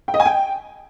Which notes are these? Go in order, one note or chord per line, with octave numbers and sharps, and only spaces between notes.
G5
D#5
G#5
G5